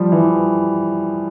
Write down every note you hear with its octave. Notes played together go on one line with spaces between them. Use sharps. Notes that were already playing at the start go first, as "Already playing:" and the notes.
Already playing: F3 G3
E3